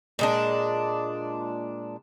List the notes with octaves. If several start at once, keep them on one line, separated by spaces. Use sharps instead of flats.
A#2 G#3 D4